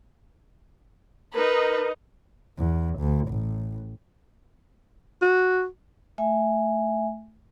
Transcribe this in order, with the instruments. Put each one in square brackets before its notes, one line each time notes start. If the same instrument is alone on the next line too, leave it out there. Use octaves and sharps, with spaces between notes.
[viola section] D#4 D#5 [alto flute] A#4 [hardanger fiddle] B4
[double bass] E2
D2
A1
[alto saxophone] F#4
[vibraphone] A3 E5 G#5